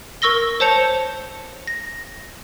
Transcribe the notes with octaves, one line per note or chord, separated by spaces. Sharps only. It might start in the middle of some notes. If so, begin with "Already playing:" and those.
A#4 C#6 E6 A#6 G7
C5 C#5 A5 G6 C#7 F7
A#6